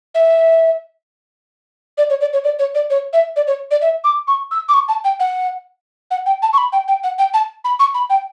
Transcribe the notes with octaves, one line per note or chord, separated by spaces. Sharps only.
E5
D5
C#5
D5
C#5
D5
C#5
D5
C#5
E5
D5
C#5
D5
E5
D6
C#6
E6
D6
C#6
A5
G5
F#5
F#5
G5
A5
C#6
B5
G5
G5
F#5
G5
A5
B5
C#6
B5
G5